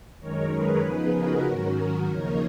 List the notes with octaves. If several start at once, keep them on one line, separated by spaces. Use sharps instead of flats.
F#2 D#3 G#3 A#4 C#5
G#4 B4
C#3 F3 B3 D#4
F#4 A#4
G#2 D#3 F#3 C#4
D#2 C#3 F3 A#3 D#4 A#4 C#5